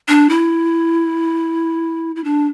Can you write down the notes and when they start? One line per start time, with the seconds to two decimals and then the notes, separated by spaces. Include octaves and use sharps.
0.08 D4
0.30 E4
2.16 E4
2.24 D4